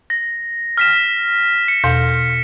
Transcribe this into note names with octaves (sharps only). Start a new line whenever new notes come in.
A#6
F6 B6 E7
C#7
E2 B2